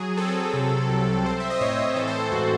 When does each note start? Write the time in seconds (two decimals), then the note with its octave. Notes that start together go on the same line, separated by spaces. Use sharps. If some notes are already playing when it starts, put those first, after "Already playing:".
Already playing: F#3 G#4
0.17 C4 A4
0.53 C3
0.89 C2
1.25 C4 C5
1.40 E5
1.50 D#5
1.61 A2 C#5
1.96 E3 A4
2.07 C5
2.18 A4
2.32 G#2 F#4